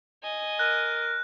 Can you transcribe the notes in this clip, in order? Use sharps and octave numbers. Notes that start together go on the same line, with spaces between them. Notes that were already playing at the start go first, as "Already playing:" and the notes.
D#5 G#5
A#4 F#6